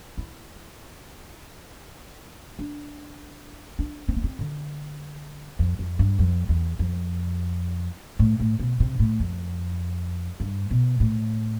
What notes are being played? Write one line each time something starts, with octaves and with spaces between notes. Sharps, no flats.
E4
D4
D4
C4
B3
C4
D3
F2
F2
G2
F2
E2
F2
A2
A2
B2
C3
A2
F2
G2
B2
A2